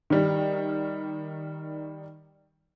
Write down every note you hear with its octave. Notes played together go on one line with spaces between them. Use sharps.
D#3 G3